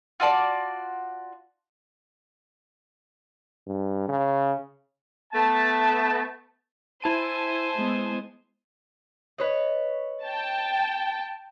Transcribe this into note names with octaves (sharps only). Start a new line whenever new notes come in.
F4 F#4 D5 A5
G2
C#3
A3 B3 E5 A5
E4 C5 G#5 A5 D#7
G#3 B3
B4 C#5 D#5
G5 A5